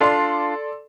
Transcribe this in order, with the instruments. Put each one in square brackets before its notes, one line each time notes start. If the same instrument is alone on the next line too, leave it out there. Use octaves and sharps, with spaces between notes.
[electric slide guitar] D4 F4 [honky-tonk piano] A4 D5 C6